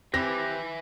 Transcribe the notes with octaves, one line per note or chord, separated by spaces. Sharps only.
E3 C4 G4 B4 E5 G#5 A#6